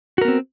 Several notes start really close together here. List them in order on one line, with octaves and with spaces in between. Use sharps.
F#4 A#4 B3 C4